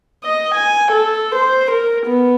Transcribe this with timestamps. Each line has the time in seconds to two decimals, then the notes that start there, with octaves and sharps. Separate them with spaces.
0.25 D#5
0.55 G#5
0.92 A4
1.35 C5
1.71 A#4
2.06 B3